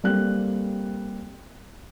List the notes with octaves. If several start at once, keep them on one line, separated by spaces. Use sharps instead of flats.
G3 A#3 C4 G4 A4 F#6